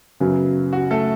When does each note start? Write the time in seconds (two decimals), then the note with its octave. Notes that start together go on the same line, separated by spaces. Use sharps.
0.20 F#2 C#3 F#3 B3
0.73 F#4
0.91 A3 A4